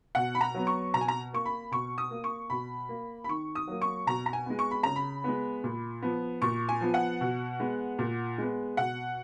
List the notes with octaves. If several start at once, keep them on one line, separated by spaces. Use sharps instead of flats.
B2 F#5
B5
A#5
F#3 B3
C#6
B2 A#5
G#5
A#5
A#3 C#6
B5
B2 C#6
D#6
A#3
C#6
B2 B5
A#3
B5
D#3 C#6
D#6
F#3 A#3
C#6
B2 A#5
A#5
G#5
G#3 B3
C#6
B5
C#3 A#5
B5
G#3 B3
A#2
F3 B3
A#2 C#6
G#5
F3 B3
F#5
B2
G#3 B3
A#2
G#3 B3
B2 F#5